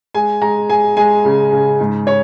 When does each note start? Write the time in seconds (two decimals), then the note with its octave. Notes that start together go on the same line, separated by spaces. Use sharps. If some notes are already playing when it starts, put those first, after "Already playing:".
0.15 G#3 G#5
0.42 G#3 A#5
0.70 G#3 G#5
0.97 G#3 G#5
1.25 C#3
1.52 C#3
1.80 G#2
2.07 C#5